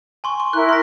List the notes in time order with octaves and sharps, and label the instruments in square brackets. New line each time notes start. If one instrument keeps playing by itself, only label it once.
[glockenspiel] G#5 C6 C#6
C#6
[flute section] E4 A#4 [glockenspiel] F#6
[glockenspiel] C6 A#6